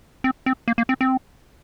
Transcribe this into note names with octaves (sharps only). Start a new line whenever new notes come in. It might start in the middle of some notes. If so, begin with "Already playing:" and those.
C4
C4
A#3
A#3
C4
C4